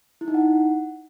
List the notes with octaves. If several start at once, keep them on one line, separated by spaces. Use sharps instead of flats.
E4
D#4
F#5